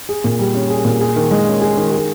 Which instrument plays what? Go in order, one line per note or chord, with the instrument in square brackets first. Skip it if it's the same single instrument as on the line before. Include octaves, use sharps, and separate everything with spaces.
[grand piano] G#4
A#2
G3
C#4
G#4
A#2
G#4
D#3
G#3
C#4
G#4
D#3
G#4